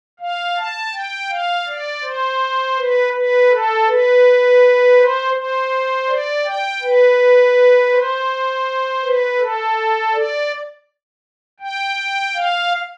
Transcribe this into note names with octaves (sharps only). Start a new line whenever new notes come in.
F5
A5
G5
F5
D5
C5
B4
B4
A4
B4
C5
C5
D5
G5
B4
C5
B4
A4
D5
G5
F5